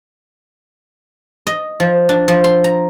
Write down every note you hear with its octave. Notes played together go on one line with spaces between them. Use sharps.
D#5
F3
D4
F3
C6
A#5